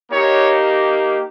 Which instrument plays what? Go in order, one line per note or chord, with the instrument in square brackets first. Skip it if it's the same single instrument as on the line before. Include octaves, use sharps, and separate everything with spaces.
[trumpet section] A#3 D#4 G4 C#5